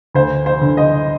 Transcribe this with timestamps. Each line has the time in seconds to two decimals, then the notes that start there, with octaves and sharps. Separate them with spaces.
0.14 D2 C5
0.46 C5
0.61 D3
0.77 D#5